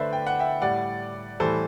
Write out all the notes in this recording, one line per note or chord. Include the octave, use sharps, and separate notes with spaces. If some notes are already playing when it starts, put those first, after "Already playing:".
Already playing: D3 A3 B4 C5 D5 E5
G5
F#5
E5 G5
A2 G3 D5 F#5
A2 E3 G3 A4 C5